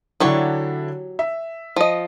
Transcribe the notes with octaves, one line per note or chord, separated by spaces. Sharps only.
D3 F#3 D4 E4 G4 C#5
E5
F3 D#5